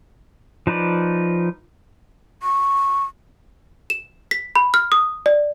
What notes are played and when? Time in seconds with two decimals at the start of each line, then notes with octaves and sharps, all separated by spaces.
0.67 F3 D#4 B4 D5
2.43 C#6
3.90 E7
4.31 B6
4.56 B5
4.74 F6
4.92 D#6
5.26 D5